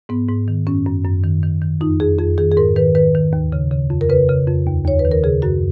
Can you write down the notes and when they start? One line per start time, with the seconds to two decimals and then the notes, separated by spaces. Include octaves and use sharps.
0.09 G#2 B3
0.29 G#2
0.48 D#3
0.67 F#2 C#4
0.86 F#2
1.05 F#2
1.24 D#3
1.43 D#3
1.62 D#3
1.81 F2 D#4
2.00 F2 G#4
2.19 F2 G#4
2.38 D#3 G#4
2.52 G#4
2.57 G#2 A#4
2.76 D#3 B4
2.95 D#3 B4
3.15 D#3
3.33 D#2
3.52 C#3
3.71 C#3
3.90 F2
4.01 A#4
4.09 C#3 B4
4.29 C#3
4.47 F2
4.66 D#2
4.85 D#2 C#5
4.99 B4
5.05 D#3
5.12 A#4
5.24 C#3 G#4
5.42 F#2 F#4